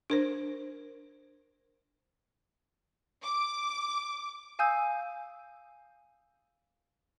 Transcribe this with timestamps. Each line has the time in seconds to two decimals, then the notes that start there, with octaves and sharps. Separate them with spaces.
0.10 D4 A#4 C5
3.24 D6
4.59 F5 G#5 D#6 E6 G6